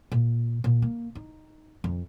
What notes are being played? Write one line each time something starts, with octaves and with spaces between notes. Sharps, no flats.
A#2
A#2
A#3
D#4
F2